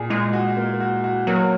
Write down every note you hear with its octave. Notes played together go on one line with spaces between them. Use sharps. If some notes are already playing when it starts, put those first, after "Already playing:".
Already playing: A#2 G#4
A#2 G#3
F#4
A#3
F#4
F#4
F#3 A#3